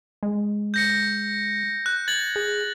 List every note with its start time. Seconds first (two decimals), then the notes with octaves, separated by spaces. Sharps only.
0.23 G#3
0.74 G6 A#6 C#7
1.86 F#6
2.08 G#6 A6 F#7
2.36 G#4